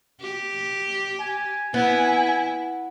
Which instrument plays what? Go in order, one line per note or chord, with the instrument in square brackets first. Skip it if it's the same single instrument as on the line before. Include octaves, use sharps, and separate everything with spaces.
[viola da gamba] G4
[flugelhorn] G#5
[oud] B3 [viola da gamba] E4